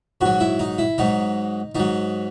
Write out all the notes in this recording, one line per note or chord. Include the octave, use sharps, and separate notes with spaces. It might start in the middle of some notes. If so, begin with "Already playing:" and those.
G#2 F#3 F#4
E4
D#4
E4
G#2 F#3 D#4
G#2 F#3 D#4